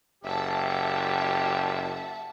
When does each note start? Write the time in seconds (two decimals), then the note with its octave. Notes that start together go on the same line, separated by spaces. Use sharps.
0.24 F#1 G4 E5 F#5 A5